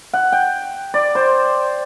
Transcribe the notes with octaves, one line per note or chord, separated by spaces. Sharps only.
F#5
G5
D5
C5